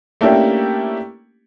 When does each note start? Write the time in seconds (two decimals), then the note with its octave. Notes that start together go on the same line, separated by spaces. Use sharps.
0.21 A3 A#3 C#4 D4 E4 G4